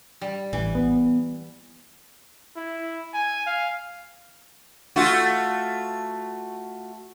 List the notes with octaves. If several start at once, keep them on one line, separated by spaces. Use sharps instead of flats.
G3
A1 E3
B3
E4
G#5
F5
A3 F4 F#4